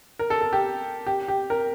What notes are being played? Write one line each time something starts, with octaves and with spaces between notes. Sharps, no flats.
A#4
A4
A4
G4
G4
G4
A#4